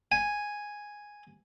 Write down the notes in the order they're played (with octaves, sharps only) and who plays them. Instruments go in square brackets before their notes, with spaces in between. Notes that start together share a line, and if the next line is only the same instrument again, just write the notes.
[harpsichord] G#5